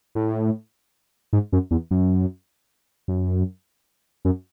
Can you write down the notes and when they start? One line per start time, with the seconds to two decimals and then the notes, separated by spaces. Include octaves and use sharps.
0.15 A2
1.33 G#2
1.53 F#2
1.71 E2
1.91 F#2
3.08 F#2
4.25 F#2